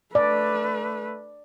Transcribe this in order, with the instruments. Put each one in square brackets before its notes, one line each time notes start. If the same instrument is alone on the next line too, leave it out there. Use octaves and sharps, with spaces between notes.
[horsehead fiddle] A3 B4 [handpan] D5